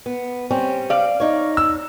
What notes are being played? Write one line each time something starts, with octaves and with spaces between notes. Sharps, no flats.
B3
G3 C4 C#4
D5 F5
D#4 C#5
E6